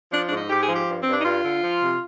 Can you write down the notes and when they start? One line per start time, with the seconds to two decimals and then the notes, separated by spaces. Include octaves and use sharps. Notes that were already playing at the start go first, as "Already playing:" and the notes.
0.12 F3 D4
0.25 D4
0.31 G#2
0.37 D#4
0.50 G#2 G4
0.62 G#4
0.69 F3
0.75 G4
0.88 G2
1.01 C4
1.07 G2
1.13 D4
1.20 D#4
1.25 G2 F4
1.44 D3
1.63 F3
1.81 C3